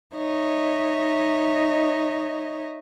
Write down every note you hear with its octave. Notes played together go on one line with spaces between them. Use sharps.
D#4 C#5 D#5 E5